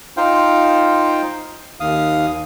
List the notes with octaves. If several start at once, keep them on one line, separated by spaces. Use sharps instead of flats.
D#4 F4 C5 F5 G5
D#2 F5 D#6